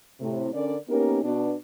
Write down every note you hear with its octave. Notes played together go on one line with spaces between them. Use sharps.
A2 C3
D3 C#4 A#4 D5
A#3 B3 C#4 D#4 G4 A#4
B2 D4